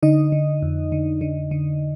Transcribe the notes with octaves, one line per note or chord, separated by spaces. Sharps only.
D3 D#4 D#5
D3
F2
D3
D3
D3